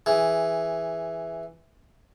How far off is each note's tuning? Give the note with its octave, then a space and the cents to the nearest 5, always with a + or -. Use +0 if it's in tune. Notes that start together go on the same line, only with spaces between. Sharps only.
E3 +0 G#4 +0